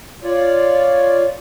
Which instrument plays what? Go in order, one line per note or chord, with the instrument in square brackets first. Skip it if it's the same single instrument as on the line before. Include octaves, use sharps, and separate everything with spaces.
[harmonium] F4 C#5 D5